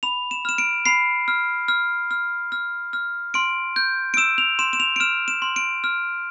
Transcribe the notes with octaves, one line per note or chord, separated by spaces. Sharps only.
B5 F7
E7
F6 E7
D7
B5 C7
F6
F6
F6
F6
F6
C6 D7
G6
D7
E6 E7
F7
C6 E7
E7
F7
D7
F6 E7
E7
C6
D7
F6